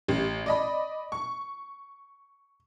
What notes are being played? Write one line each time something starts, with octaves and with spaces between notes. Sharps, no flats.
A1 G4
D5 D#5 B5
C#6